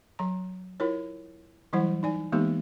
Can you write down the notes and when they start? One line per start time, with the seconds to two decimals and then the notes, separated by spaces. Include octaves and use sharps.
0.19 F#3 A#5
0.80 E4 F4 A#4 C#5
1.73 E3 F#3 G3 E4 C5 F#5
2.03 D#4 D5 G#5
2.32 E3 G#3 A#3 B3 D#4 G4